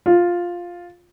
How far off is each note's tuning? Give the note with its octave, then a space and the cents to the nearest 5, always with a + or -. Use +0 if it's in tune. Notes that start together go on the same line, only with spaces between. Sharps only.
F4 +5